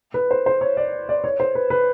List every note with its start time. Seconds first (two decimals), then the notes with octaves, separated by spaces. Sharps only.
0.14 B4
0.31 C5
0.46 C5
0.61 C#5
0.77 D5
1.09 D5
1.24 C#5
1.40 C5
1.55 B4
1.70 B4